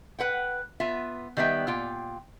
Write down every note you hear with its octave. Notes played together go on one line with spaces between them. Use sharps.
B4 F#5 G5
B3 F4 E5
D#3 G3 B3 E5 G5
A#2 F4 G5